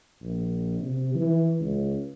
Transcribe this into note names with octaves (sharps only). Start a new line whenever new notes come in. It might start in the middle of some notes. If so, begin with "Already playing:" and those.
A#1
C3
E3
C#2